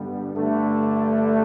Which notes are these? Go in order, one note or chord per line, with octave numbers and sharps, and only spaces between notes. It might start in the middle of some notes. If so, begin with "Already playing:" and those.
Already playing: G2 D3 G3 B3
G2 D3 A3